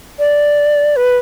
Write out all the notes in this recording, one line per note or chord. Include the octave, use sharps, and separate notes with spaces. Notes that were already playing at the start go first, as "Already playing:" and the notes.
D5
B4